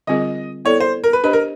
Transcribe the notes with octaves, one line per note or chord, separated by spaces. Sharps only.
D3 G3 C4 F4 G#4 D#5
B3 E4 A4 C#5 D5
C5
A#4
B4
D4 G4 B4 C5 D#5
A#4